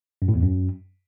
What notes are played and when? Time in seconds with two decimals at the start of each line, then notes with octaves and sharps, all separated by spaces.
0.22 F#2
0.28 A2
0.35 E2
0.42 F#2